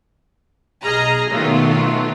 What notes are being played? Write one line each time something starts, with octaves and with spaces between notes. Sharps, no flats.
B1 G#4 D#5 A#5 F6
B2 D#3 F#3 A3 B3 F4